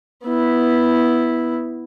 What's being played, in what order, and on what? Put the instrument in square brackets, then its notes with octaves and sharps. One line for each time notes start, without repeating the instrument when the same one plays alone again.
[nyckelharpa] B3 E4